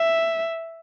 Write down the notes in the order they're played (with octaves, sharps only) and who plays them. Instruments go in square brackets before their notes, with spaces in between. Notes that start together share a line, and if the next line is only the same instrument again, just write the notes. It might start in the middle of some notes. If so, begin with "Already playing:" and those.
Already playing: [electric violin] E5